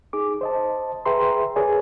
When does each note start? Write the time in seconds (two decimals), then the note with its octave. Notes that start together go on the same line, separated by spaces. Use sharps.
0.13 D#4 G#4 D6
0.41 C5 D#5 A5
1.06 G#4 B4 E5 G5 A#5 C6
1.56 G#4 A#4 B4 C#5 D5 G#5